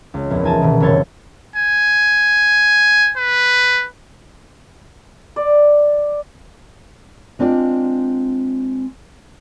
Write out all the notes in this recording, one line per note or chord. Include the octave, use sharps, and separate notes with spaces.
C#2
A#1 E2
D#4 G#5 A5
D#1 B2 D#3
F#1 C2 E3 C#5 C6 A6
G#5
B4
D5
G#3 C4 D4 F4 D5